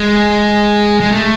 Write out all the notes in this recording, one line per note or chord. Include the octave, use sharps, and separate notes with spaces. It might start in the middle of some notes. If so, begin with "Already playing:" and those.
Already playing: G#3
G#3
A3